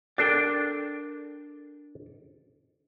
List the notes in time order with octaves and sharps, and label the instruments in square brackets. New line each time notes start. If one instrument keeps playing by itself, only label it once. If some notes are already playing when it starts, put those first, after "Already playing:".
[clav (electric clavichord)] D4 G5 [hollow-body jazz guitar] A4 A#4 D5